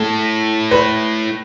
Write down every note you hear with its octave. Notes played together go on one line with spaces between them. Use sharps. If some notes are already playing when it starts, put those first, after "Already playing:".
Already playing: A2 A4
B4